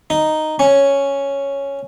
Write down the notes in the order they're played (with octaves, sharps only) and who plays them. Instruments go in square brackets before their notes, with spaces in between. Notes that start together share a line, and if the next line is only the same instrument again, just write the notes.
[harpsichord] D#4
C#4